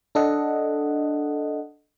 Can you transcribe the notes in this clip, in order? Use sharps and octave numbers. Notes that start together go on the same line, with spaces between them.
D4 A4 D#5 F#5